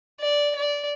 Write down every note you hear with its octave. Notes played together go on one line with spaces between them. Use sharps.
D5
D5